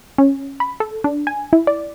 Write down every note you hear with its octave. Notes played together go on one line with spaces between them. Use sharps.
C#4
B5
A4
D4
G#5
E4
D5